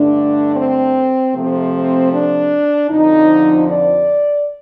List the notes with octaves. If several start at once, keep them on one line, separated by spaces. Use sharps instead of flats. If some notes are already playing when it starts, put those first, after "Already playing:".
Already playing: G2 D3 A3 D4
C4
C3 F3 A3 C4
C4
D4
F2 D3 F3 D#4
D5